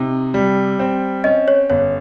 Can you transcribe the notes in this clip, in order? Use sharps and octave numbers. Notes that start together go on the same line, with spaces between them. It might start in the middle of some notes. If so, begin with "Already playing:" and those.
Already playing: C3 D#4
G3
C4
C#4 D#5
C#5
G1 C#5